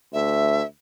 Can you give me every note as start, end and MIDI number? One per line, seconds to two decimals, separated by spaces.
0.13 0.62 38
0.13 0.64 76